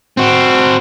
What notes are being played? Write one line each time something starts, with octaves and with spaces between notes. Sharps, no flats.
C4 F#4